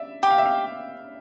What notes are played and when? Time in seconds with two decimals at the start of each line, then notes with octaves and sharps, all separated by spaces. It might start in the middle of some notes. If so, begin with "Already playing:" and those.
Already playing: D5 E5
0.23 G4 G5
0.31 F5
0.38 E5
0.46 F5